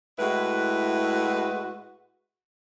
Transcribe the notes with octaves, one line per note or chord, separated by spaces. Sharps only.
A2 G#3 E4 F#4 B4